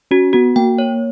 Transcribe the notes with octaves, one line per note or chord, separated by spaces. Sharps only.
C#4 F#4
B3 F#4
A#3 G5
C#5